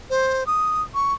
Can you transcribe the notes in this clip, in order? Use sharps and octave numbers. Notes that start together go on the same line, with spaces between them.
C5
D#6
C#6